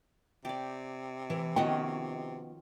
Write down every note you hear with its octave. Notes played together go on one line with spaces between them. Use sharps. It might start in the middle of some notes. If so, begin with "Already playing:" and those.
C3 G4 D5
E3
D#3 F3 B3 C#4 F#4 D#5 G5